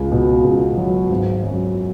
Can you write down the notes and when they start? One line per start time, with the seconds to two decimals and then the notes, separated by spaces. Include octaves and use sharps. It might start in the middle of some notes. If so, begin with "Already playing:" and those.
Already playing: C#2
0.12 B2
0.44 C#2
0.77 F#3
1.10 G#1
1.43 F#2